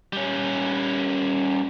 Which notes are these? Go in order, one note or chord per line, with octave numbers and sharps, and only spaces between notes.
G3 C#4